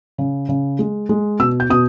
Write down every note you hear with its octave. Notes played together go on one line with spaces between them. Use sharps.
C#3
C#3
G#3
G#3
B2 E6
G6
B2 D#6